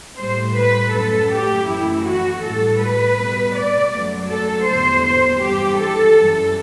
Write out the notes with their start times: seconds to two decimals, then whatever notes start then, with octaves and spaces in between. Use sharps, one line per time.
0.17 A2 G3 C5
0.55 B4
0.92 F#2 F#3 A3 A4
1.30 G4
1.67 F#2 E3 A3 E4
2.06 F#4
2.43 A2 G3 A4
2.80 B4
3.17 B2 G3
3.55 D5
3.92 F#2 F#3 A3
4.29 A4
4.67 E2 D3 G3 C5
5.05 C5
5.42 G2 E3 G3 G4
5.80 A4
6.17 F#2 E3 G3